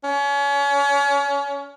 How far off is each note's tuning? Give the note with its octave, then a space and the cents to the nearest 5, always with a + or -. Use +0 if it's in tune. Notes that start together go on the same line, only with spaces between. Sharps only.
C#4 +30